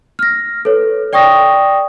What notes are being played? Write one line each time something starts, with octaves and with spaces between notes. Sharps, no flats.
F6 A#6
A4 B4 C#5
D5 G5 C#6 D#6 A#6